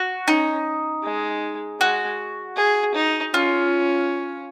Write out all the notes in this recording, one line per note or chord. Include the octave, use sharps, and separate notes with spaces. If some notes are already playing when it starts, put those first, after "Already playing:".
Already playing: F#4
C#4 D#4
G#3
G#3 F#4
G#4
D#4
C#4 F4